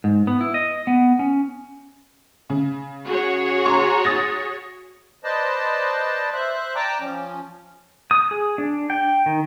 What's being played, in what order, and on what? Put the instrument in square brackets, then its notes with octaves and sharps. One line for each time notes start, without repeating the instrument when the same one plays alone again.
[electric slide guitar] G#2
B3
E4
D#5
B3
C#4
[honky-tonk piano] C#3
[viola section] F#4 G#4 C#5
[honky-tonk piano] A#5 C6 C#6
D#6 A6 A#6
[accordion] B4 C5 D5 D#5 A5
C5 E5 F#6
D5 G5 A5 A#5 D6
F3 C#4
[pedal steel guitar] D#6
G#4
D4
G5
D#3